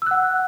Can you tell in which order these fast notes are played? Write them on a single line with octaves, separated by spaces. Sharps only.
E6 F#6 F#5